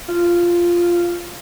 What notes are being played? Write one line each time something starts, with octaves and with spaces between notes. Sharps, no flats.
F4